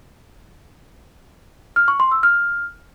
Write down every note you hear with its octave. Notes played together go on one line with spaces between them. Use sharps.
F6
C#6
C6
E6
F6